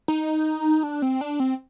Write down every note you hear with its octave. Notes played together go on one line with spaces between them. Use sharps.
D#4
D4
C4
D4
C4